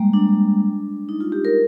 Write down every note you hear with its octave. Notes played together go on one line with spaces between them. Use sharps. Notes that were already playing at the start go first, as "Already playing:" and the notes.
Already playing: G3 G#3 A#3
D4
D#4
F4
G4
A#4